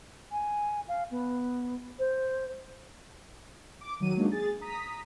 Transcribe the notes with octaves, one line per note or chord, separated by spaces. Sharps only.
G#5
F5
B3
C5
D6
D#3 F#3 D#7
F#3 G#3 A#3 D4 D#4
G#4 A6
A#5 D#6 B6